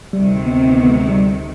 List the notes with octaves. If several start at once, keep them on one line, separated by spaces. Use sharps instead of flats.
D2 C3 D#3 G3
B3
C4
B3
B3
G#3
G3